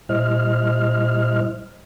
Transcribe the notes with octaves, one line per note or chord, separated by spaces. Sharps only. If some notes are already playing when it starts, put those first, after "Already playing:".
A#2 G3 E4 C5 D#5 F6